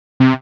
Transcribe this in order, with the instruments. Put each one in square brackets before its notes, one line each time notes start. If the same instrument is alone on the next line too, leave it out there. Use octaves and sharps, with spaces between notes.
[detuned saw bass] C3